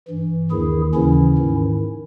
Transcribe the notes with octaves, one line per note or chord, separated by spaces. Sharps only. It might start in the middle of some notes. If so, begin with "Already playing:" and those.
G2 E3
D#2 D#3 E4 G#4
D#2 C#3 E3 C#4 E4
G#2 D#3